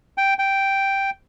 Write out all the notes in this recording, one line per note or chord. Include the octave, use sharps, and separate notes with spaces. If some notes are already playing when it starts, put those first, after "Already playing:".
G5
G5